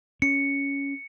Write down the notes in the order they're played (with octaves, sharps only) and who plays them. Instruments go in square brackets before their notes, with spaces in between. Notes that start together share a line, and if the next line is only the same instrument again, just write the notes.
[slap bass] C#4 [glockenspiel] C#7